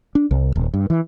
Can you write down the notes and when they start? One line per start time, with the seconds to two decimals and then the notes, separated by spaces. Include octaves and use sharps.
0.15 D4
0.31 C2
0.56 D#1
0.74 G2
0.90 E3